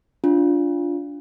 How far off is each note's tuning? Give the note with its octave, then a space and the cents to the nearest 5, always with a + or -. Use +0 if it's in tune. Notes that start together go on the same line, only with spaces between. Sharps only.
D4 -15 F4 +0